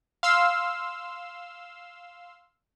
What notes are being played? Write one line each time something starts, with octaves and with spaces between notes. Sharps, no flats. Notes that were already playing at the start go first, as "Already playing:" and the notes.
F5 C6 E6